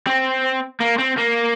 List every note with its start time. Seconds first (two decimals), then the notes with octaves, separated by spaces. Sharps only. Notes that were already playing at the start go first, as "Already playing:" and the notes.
0.07 C4
0.81 A#3
0.99 C4
1.18 A#3